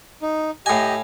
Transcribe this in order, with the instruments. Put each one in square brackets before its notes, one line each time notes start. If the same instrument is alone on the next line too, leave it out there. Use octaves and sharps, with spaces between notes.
[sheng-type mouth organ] D#4
[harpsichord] A2 G#5 [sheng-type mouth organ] G4 D#5